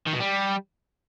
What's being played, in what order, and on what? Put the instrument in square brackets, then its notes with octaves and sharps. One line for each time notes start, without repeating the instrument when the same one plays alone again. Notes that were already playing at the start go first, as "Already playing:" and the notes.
[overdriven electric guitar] D#3
B2
G3